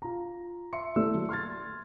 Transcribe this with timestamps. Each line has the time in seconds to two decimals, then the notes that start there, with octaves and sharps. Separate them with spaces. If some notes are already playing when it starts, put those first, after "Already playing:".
0.02 F4 A#5
0.73 E5 C6 C#7
0.96 A3 E4 D5 E6
1.14 F#3
1.29 C6 F6 G#6 A6